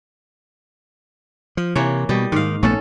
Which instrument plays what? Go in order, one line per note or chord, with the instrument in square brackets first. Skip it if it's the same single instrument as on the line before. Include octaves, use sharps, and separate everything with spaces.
[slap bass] F3
[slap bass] C3 [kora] E3 A#3 C#5
[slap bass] B2 [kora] G3 D#5
[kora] G#2 F5 [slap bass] D#3
[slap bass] A#1 A3 B3 [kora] C#4 A4